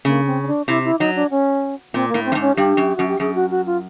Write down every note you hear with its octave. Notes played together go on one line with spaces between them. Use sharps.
C#3 A#3
C4
C#4
D4
C3 E4
E4
F#3 D#4
D4
C#4
A#2 C4
A#3
A2
C4
G2
G#2
C#4
G2 G4
F#2
F#2 F#4
G4
F#2 G#4
F#4
F#4
F4